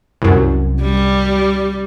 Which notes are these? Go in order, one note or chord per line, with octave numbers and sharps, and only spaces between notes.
C2 F#2
G3